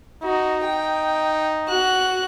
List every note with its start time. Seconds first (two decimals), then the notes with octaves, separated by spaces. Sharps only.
0.23 D#4 F#4
0.65 G5
1.68 F#4 F#6